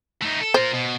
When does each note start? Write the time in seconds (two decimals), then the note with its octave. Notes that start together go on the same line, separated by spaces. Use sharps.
0.22 A3 D#4
0.40 A4
0.54 F4 A#4 C5
0.73 B2